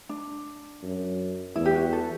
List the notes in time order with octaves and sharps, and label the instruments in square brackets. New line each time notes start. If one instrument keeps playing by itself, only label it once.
[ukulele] D4
[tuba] F#2
[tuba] E2 [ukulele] E4
[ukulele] G4
F#4
A4